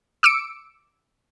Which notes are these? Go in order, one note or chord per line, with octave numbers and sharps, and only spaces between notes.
D6 E6 C#7 D7